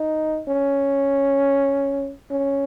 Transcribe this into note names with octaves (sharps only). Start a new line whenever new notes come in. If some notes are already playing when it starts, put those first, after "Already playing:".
Already playing: D#4
C#4
C#4